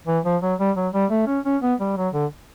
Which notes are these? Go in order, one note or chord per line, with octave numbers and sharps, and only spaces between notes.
E3
F3
F#3
G3
F#3
G3
A3
C#4
C#4
B3
G3
F#3
D3